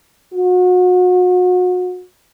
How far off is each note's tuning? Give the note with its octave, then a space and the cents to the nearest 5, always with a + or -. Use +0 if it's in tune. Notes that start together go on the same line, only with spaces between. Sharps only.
F#4 -35